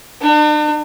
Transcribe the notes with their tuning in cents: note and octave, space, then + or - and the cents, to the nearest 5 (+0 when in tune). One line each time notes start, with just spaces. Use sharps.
D4 +45